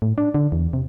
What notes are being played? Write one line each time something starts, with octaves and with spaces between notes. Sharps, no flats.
A2
D4
D3
E2
C3